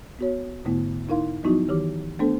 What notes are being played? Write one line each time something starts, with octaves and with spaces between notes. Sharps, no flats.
B3 F#4 C#5
G#2 D3 A3 B3 E4
D#4 E4 A#4 F5 C6
F3 F#3 B3 D#4 E4 F#4
D#3 E3 G4 D6
A3 B3 D4 A4 C5